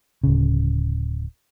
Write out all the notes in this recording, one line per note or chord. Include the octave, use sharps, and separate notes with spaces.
D1 C#3